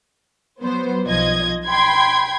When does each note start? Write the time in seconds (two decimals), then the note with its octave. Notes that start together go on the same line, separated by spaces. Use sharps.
0.62 F#3 B3 C5
1.06 B1 F3 D#5 G#6
1.65 G5 B5 C6 G#6